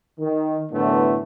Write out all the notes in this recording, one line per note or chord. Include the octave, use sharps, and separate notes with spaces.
D#3
F#2 A2 D3 E3 A3 B3